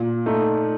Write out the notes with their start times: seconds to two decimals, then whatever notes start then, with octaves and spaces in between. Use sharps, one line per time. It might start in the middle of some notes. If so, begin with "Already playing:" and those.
Already playing: A#2
0.26 A3 D#4